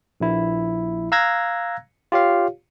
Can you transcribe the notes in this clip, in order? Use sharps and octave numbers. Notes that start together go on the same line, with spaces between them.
A#1 E4
F5 A#5 E6 F#6 G#6 A#6
F4 G4 C#5 F5